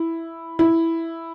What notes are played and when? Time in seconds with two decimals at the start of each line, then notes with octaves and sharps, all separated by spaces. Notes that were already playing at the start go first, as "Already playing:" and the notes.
Already playing: E4
0.59 E4